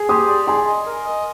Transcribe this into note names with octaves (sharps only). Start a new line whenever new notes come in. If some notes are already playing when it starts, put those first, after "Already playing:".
Already playing: G#4
G4 C6 D#6
D5
G#4 G#5 C6
D#5
A#4
D#5